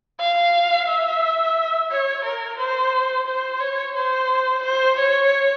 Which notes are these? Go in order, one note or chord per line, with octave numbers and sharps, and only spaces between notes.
F5
E5
C#5
A#4
C5
C5
C#5
C5
C5
C#5